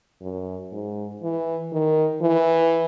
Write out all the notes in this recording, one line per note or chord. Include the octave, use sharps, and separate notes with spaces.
F#2
G#2
E3
D#3
E3